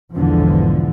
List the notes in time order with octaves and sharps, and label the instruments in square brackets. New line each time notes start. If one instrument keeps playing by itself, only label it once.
[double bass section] B1 E2 G#2 D3 E3 F3